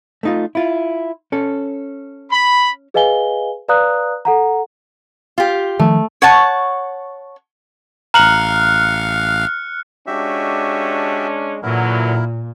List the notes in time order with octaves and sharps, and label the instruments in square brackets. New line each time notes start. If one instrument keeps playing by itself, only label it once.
[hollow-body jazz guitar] A3 D#4 F4
E4 F4
C#4 A4
[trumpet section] B5
[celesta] G#4 B4 D#5 F5 G#5 G7
B4 D5 F5 A#5 D#6 F#6
A4 F#5 A#5
[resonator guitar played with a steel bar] F4 G4
[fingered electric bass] D#3 F3 [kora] A3
[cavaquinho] C#5 F#5 A5 C#6
[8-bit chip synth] A1 F5 [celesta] A#5 F#7 [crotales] F6 F#6 C#7
[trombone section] G#3 C#4 D4 [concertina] F#4 G4 E5
[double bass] A#2 [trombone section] D3 E3 F#3 [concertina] E4 A#4